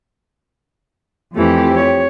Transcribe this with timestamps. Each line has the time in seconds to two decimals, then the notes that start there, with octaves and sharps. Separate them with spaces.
1.35 F2 E3 A3 G4
1.75 C#5